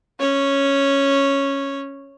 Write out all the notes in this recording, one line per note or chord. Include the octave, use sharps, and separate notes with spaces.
C#4 C#5